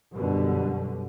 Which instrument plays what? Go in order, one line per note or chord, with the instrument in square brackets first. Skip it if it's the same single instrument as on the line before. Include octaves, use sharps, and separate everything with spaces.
[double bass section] F#2 B2 D3 G3